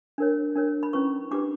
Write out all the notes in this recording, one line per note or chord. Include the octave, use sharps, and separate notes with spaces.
D4 A#4 C#5
D4 A#4 C#5
B5
C#4 E4 B4 C#6
D4 G4 B4 D6